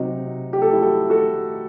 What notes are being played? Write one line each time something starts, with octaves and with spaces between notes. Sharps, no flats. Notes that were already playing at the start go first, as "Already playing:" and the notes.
Already playing: C3 F#3 C4 D#4 F#4
G4
A4
E4 G4
F#4 A4
F#4 A4